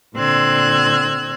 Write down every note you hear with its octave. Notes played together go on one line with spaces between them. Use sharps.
A#2 D3 C4 E6 F#6 G#6